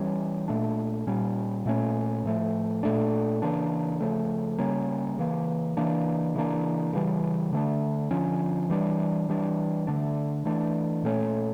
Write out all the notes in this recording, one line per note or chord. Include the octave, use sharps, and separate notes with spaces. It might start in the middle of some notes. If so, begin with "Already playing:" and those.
Already playing: E3 G3 C#4
A#2 A3 D4
A#2 G3 C#4
A#2 A3 C#4
A2 F3 A3
A#2 A3 D4
C#3 E3 A#3 D4
C#3 F3 A3
C#3 G3 A#3 C#4
C#3 E3 A#3
C#3 E3 A#3 D4
C#3 E3 A#3 D4
C#3 E3 G3
D3 A3 D4
D3 F3 C#4
E3 G3 D4
E3 G3 D4
D3 A3 D4
E3 A3 D4
A#2 A3 C#4